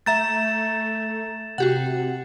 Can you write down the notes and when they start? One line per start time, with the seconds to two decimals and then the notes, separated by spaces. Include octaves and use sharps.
0.06 A3 E5 A#5 G6 A6 E7
1.58 C3 F#4 G4 F#5